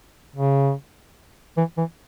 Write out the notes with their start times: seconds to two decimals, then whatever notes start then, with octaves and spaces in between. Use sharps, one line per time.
0.36 C#3
1.57 E3
1.78 E3